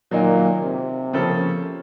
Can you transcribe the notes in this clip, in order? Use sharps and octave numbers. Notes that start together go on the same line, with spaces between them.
A#2 D#3 F#3 A#3 D#4
C3
C#3 F3 A#3 C#4 A4